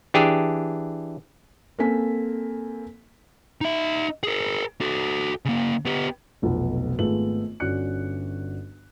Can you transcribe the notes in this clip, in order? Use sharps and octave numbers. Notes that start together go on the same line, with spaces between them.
E3 D4 G4 G#4
A#3 C4 A4 G#5 B6
D#4 E5
G#4 A#4
F#4 A4
C#3 A#3
B3 G4
F1 B1 F2 B2
G#1 A3 B3 F4 G#4 F#7
G1 C#4 F#4 D5 F#6 C#7